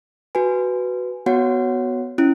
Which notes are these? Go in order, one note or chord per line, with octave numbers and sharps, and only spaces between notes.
F#4 B4 G#5
B3 F#4 C#5 F#5
C#4 E4